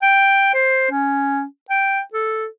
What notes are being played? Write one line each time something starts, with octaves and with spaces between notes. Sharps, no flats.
G5
C5
C#4
G5
A4